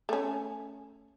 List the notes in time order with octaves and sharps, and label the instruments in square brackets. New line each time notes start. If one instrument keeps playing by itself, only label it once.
[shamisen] A3 C#4